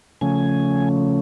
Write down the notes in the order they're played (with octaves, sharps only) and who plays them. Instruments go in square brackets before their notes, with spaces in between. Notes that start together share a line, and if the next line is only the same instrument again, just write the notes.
[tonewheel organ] C#3 F3 A3 C#4 G#5